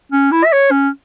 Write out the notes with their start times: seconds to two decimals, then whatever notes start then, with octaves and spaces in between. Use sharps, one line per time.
0.12 C#4
0.32 E4
0.45 E5
0.52 C#5
0.71 C#4